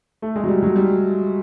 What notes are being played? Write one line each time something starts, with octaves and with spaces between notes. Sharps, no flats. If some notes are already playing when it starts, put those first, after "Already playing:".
A3
G#3
F#3
G3
F#3
G3